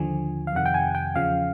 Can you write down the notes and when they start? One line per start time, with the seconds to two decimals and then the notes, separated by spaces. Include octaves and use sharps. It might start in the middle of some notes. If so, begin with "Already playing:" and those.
Already playing: D#2 D3 F3 G#5
0.47 F5
0.53 F2 C3 D#3 F#5
0.66 G5
0.74 G#5
0.95 G5
1.15 E2 C#3 F3 F5